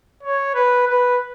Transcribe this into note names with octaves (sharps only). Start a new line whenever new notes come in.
C#5
B4
B4